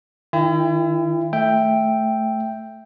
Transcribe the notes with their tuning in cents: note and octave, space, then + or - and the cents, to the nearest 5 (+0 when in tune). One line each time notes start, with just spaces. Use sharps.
D#3 +0 E4 +40 G5 +35
A3 +0 E5 +0 G5 +0